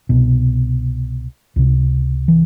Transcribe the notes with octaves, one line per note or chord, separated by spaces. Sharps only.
C2 B2
C#2 C3
E3